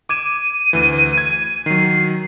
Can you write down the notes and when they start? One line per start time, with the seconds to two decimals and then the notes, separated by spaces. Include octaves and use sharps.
0.09 D6 G#6 D#7 E7
0.73 D2 E3
1.18 G#6
1.66 D#3 F#3 C7